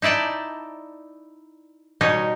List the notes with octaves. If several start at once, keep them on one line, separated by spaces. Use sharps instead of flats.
D#4 E4 D5 G5 A5
B2 G3 D#4 C#5